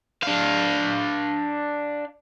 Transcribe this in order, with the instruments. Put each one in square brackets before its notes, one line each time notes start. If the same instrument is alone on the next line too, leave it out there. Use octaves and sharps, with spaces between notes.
[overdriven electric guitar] D4 F5